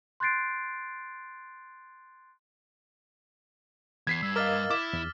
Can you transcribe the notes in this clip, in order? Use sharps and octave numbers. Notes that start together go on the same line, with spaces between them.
C6 F#6 G6 A6 C7 D7
E2 G#6 B6 C7
G2 E6
A#4 D#5 F5 D6 F6 A6
E4 D6 B6
E2